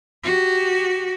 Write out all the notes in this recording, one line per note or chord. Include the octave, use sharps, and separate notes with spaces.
F#4 G4